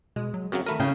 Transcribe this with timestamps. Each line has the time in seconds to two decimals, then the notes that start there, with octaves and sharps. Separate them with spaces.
0.16 B2 G#3
0.34 F#3
0.52 F#2 C#3 F#3 C4
0.66 D#3 A3 A#4 B5 D#7
0.80 A2 C#3 C#5 G5 G6